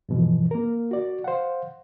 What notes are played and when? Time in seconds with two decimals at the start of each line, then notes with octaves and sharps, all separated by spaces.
0.09 E2 G2 B2 E3 F3
0.51 A#3 A#4
0.91 F#4 D5
1.24 C5 F5 F#5